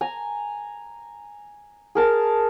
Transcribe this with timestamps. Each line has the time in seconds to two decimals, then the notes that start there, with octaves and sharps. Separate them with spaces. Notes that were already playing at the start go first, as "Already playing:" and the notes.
0.01 G#5 A#5
1.95 G#4 A#4 A5